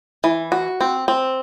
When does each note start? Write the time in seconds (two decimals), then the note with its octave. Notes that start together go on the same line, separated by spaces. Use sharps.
0.24 E3
0.52 F#4
0.81 C4
1.08 C4